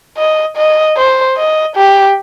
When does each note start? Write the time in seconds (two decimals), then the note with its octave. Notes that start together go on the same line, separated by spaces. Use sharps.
0.17 D#5
0.57 D#5
0.97 C5
1.37 D#5
1.76 G4